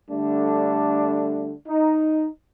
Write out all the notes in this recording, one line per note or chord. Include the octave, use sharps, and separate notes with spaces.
D3 G3 A3 D4
D#4